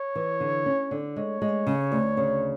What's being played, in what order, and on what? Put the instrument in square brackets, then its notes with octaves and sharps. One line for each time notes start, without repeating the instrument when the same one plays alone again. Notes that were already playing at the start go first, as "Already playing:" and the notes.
Already playing: [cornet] C#5
[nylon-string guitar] E3
D3
C#4
D3
[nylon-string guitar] G#3 [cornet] C#5
[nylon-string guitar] G#3
C#3
D2
C#3